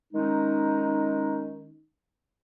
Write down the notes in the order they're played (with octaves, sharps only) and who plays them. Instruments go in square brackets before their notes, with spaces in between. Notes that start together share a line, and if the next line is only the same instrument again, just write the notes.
[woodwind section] D#3 G#3 C#4 D#4